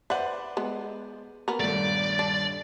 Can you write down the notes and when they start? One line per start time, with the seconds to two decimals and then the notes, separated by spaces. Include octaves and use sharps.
0.10 B4 C5 D5 E5 F#5
0.57 G#3 B3
1.48 B3 A#4
1.60 D#1 G2 A3 D5
2.19 D4